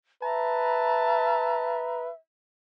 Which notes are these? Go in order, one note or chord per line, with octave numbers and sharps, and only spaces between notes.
B4 E5 A5 A#5